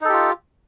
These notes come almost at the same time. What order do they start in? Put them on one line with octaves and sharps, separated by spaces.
D#4 A4 G4 F4